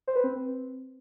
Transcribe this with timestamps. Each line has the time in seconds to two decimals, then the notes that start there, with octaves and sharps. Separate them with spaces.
0.08 C5
0.16 B4
0.24 C4